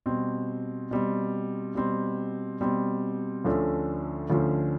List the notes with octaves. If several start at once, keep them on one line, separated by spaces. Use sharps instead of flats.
B2 G3 C4
B2 G3 C4
B2 G3 C4
B2 G3 C4
D2 D3 F3 A3 C#4
D2 D3 F3 A3 C#4